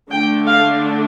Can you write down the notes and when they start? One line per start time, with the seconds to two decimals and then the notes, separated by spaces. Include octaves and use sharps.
0.11 D3 A3 D4 G5
0.47 F5